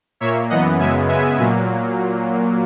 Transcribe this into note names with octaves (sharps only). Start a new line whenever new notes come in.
A#2 A#3 C#5 E5
F#2 E3 B3 D#5 F#5
F#2 C#3 G#3 B3 E5 G#5
C#3 G#3 B3 E5 G#5
A#2 F#3 A#3